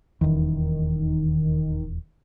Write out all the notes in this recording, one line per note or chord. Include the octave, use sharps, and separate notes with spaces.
D#1 E2 D#3